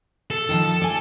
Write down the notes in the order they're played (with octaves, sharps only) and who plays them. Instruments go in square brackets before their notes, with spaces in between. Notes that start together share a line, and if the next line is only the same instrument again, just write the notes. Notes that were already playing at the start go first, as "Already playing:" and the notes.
[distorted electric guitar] A4
[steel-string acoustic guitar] D#3 F3
D5 G#5